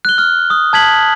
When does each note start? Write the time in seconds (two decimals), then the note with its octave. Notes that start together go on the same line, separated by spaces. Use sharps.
0.05 F#6 G7
0.18 F6
0.50 D#6
0.73 A5 G#6 B6 F#7